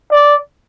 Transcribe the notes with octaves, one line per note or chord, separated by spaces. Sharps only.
D5